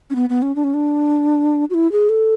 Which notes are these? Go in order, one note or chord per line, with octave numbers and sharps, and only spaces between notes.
C#4
B3
B3
C#4
D4
C#4
D4
F#4
E4
G#4
A4